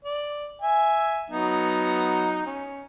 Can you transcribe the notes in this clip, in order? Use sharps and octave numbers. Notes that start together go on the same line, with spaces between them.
D5
E5 G#5
F#3 B3 D#4
C#4